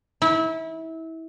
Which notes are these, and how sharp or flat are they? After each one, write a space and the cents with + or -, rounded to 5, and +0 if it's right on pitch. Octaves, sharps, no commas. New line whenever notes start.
E4 -25